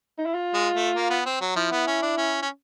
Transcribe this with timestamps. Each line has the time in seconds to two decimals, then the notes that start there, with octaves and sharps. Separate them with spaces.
0.18 D#4
0.26 E4
0.35 F4
0.54 G#3
0.75 A3
0.96 A#3
1.10 B3
1.26 C4
1.41 F#3
1.56 F3 E4
1.72 B3
1.88 C#4
2.02 D4
2.18 C#4
2.42 C#4